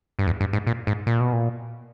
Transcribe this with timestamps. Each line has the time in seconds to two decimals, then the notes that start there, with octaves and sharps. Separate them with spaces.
0.19 G2
0.27 E2
0.41 G2
0.53 G#2
0.67 A#2
0.87 G#2
1.07 A#2
1.20 B2
1.33 A#2